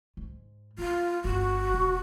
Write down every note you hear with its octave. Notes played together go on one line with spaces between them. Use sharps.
G#2
A3 F4
G1 F#4
E1